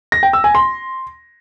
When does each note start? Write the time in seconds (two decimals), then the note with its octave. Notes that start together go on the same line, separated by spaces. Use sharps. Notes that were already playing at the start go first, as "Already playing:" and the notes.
0.12 A#6
0.23 G5
0.33 E6
0.44 G#5
0.55 C6